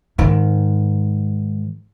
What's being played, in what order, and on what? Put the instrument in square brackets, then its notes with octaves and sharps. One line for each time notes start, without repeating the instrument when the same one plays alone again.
[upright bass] G#2 D#3